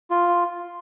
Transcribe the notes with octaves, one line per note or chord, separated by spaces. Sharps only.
F4